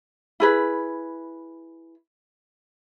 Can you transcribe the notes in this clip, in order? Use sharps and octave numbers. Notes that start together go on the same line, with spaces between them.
E4 G#4 B4